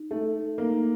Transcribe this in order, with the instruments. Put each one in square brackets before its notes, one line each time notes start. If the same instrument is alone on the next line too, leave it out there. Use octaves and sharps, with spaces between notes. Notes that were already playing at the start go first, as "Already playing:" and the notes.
Already playing: [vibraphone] D#4
[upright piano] A3 [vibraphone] A4
[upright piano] A#3 [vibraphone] D#4